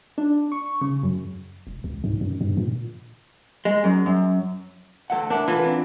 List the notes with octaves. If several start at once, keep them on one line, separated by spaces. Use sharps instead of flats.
D4
C#6
C#3
F#2
E1
C#2
G#2
F#2
G2
A#2
G#3
F#2
F#2
D2 E3 A4 F#5
D4 E4 A#4 F#5
E3 F4 A4 B4
C4 D4